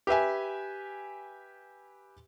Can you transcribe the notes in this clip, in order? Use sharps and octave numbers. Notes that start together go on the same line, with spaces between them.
G4 B4 E5 G#5